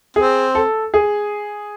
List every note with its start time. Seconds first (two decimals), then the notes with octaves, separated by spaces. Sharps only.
0.16 C4 G#4
0.55 A4
0.94 G#4